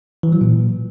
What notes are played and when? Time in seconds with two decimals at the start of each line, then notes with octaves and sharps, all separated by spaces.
0.23 E3
0.32 F#3
0.41 A#2